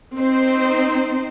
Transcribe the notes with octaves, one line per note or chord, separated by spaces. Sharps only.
C4 D#4 C5